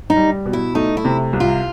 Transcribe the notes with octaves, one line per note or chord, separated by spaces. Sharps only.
D#4
G3
B2
E4
A3 D#4
E4
C3
C2
F4